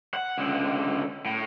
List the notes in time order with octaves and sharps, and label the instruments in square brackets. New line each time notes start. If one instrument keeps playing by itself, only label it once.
[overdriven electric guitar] F#5
C#2 D3
A2